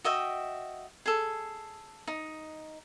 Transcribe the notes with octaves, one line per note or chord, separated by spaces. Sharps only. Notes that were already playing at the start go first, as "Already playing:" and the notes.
F#4 D#5 E5 G5
G#4 A4
D#4